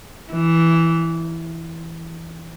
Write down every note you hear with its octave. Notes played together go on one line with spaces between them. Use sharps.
E3